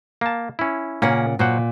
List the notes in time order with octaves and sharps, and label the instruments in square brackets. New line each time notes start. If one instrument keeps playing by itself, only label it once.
[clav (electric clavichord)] A#3 A5
C#4 E4
[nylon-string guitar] A#2 C#3 F#5 [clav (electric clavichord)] A#3 C#4
[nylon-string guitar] A#2 [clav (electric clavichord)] F#3 C5 F#5